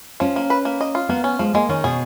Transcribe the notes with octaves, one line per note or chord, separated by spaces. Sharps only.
F3 C#4
A#3
B4
A#3
D#5
F4
A#3 B3
C#4
F3 G#3
G#3 A#3
D#3 C#4
B2 G#4